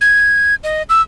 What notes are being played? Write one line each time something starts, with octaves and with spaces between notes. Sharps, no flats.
G#6
D#5
E6